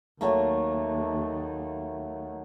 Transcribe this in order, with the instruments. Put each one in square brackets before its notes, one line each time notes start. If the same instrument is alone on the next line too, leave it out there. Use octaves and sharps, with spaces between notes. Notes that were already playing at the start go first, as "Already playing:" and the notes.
[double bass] D#2 [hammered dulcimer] F#3 A3 A#3